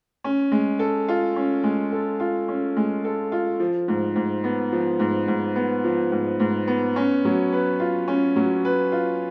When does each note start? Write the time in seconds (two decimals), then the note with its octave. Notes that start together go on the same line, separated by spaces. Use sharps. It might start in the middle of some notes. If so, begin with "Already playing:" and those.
0.24 C#4
0.52 G#3
0.79 A4
1.08 F4
1.36 C#4
1.63 G#3
1.92 A4
2.20 F4
2.48 C#4
2.77 G#3
3.05 A4
3.32 F4
3.60 F3
3.88 G#2
4.16 G#2
4.44 B3
4.72 F3
4.99 G#2
5.28 G#2
5.56 B3
5.84 F3
6.12 G#2
6.40 G#2
6.68 B3
6.96 C#4
7.25 F#3
7.53 B4
7.80 F4
8.08 C#4
8.36 F#3
8.65 B4
8.92 F4